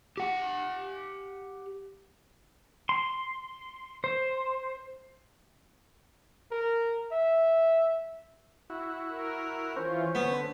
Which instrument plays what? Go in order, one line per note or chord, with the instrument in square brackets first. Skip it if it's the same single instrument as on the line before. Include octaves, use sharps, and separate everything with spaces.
[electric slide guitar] G4 F#5
[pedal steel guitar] C6
C5
[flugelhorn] A#4
E5
[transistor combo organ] E4 F#4
[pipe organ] A#4
[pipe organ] E3 F4 [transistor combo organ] C#4 [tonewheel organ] C5
[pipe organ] D3 [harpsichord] B3